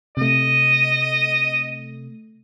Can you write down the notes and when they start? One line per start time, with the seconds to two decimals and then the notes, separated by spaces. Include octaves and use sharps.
0.17 C3 A3 D#5